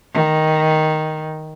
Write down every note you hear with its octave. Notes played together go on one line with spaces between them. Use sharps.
D#3